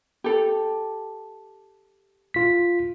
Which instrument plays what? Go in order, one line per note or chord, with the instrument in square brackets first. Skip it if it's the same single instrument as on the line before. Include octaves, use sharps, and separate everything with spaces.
[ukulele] G4 A4
[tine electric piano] F4 B6